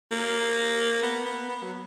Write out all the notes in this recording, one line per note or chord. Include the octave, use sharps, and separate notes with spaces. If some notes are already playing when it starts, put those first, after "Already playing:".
A#3
B3
B3
B3
F#3